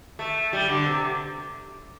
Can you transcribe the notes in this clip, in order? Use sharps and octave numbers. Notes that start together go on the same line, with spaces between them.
A3
G3
D3
C3